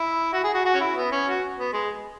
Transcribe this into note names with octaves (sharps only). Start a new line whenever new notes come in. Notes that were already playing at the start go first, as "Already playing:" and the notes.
Already playing: E4
F#4
G#4
F#4
F#4
C#4
E4
B3
C#4
F#4
B3
G#3